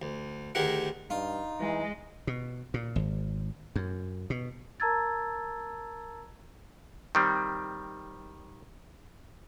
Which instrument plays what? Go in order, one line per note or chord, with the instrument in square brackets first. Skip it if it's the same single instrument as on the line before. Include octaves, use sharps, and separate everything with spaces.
[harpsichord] D2
D2 D#3 G4 G#4 A#4 F#5
[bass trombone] G2 [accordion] D#4 [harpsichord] F4
[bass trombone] E3 [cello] G#3
[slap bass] B2
A#2
G#1
F#2
B2
[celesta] A#4 A5 A#5 E6 G#6 A6
[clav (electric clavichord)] D#3 G3 C4